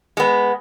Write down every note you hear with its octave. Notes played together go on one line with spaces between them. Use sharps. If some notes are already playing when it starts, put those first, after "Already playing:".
G#3 B3